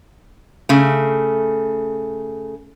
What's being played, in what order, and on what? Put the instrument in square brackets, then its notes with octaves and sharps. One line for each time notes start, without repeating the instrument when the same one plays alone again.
[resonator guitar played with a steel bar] C#3 A3